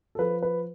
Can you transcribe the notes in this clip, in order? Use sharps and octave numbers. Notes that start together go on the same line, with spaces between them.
A4
F3 B4
B4